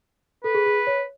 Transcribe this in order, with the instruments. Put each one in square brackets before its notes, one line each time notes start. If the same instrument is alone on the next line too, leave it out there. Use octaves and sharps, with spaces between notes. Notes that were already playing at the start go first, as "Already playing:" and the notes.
[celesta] A4 [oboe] B4
[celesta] G#4
G#4
C#5